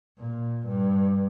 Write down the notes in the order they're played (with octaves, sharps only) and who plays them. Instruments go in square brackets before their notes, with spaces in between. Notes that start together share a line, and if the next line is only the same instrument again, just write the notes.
[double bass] A#2
G2